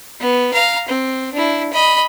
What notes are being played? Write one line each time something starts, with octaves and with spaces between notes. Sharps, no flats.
B3
F5 A#5
C4
D4 E4
D#5 B5